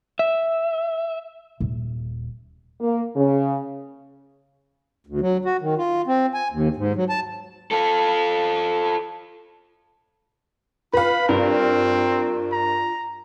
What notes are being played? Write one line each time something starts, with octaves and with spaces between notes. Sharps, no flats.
E5
D#1
A#3
C#3
D2
F#3
F#4
D#3
F4
C4
G#5
D#2
G#2
F#3
A5
F4 A4
F4 B4 F5 B5
G2 C4 F4 A#4
A#5